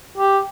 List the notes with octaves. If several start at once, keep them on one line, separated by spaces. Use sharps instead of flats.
G4